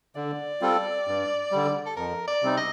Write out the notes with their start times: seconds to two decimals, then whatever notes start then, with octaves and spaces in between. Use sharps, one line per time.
0.16 D3 D5
0.62 G3 C4 F4 A4
1.07 G2
1.52 D3 G3
1.86 A4
1.97 F2 A#4
2.27 D5
2.42 C3 G3 C4 D#4
2.57 D#5